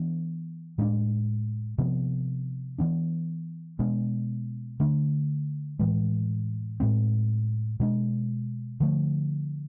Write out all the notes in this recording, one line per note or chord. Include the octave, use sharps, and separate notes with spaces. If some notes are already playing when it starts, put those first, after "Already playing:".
Already playing: E3 B3 D4
A2 G#3 B3 D4
C3 F3 B3
E3 B3 D4
B2 G#3 B3 D4
D3 A3 D4
A2 E3 G#3
A2 G#3 C4
B2 G#3 D4
D3 F3 A3